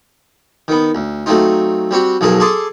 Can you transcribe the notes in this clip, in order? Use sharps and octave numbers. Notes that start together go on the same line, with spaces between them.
D#3 B3
D2
F#3 A3 C4 D#4 F4
G3 C4 F#4 G4
B1 F3 F#3 G#4 A#4 A5
G#4 A4 A5 C6 D6 D#6